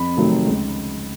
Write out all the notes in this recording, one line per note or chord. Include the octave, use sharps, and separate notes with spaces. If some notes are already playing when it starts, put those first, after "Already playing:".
Already playing: F2 B5
C3 D#3 F#3 A3
C#2